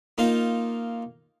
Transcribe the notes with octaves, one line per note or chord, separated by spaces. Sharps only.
A#3 D#4 F4 C5